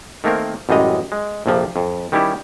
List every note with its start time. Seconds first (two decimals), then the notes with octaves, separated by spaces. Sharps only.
0.24 D#3 A3 A#3 C4 A#4
0.69 A1 F#2 G3 G#3 D#5 A#5
1.12 G#3
1.46 A#1 F2 C3 F3
1.76 F2
2.12 D#3 G3 C#4 E4 G4